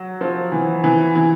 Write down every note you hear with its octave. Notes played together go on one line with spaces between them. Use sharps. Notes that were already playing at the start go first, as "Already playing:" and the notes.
Already playing: F#3
F3
E3
E3
E3